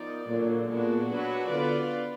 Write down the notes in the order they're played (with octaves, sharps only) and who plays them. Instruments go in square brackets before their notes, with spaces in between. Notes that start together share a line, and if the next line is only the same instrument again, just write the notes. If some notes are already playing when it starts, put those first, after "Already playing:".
Already playing: [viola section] F3 B3 D#4 A#4 D5
[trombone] A#2 [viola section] D3 F#3 A#3
[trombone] A#2 [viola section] G#3 B3 D4 F#4
[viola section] F#3 D4 F#4 B4
[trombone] D3 [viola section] B3 F4 B4 D5